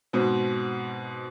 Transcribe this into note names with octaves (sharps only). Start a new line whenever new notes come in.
G#2 B2 C4